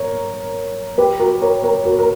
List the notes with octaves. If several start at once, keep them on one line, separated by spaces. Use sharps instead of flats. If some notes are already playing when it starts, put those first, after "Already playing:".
Already playing: A#4 C#5
G4 B4
F#4 A#4
A#4 C#5
A#4 C#5
F#4 A#4
A#4